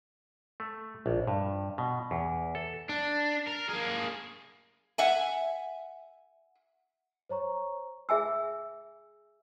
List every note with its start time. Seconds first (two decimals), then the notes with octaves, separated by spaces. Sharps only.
0.60 A3
1.06 A#1
1.27 G2
1.78 B2
2.11 E2
2.55 A4
2.89 D4
3.47 A#4
3.69 A#3 G#4
4.98 E5 F#5 G#5
7.29 C5 C#5 A#5 C#6
8.09 G#4 E5 G#5 E6